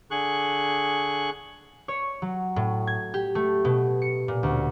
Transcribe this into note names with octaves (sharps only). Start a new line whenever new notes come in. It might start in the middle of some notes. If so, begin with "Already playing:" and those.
D3 G#4 C#6 F#6
C#5
F#3
A2
G#6
G4
A3
B2
C#7
A#2
D2